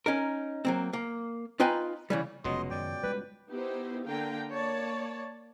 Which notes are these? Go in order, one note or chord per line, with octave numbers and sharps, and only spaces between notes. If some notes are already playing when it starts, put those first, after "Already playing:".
C#4 D#4 A#4
F#3 A#3 C4
A#3
D#4 F4 B4 G5 G#5 A#5
C#3 E3 G3
F1 C#2 B2 F#3 D#5 C6
F#2 D#3 D5 G5
G3 G#3 B4
B3 D#4 E4 G4 C5
D3 A#3 F5 G5 A#5
A#3 C#5 D5 A5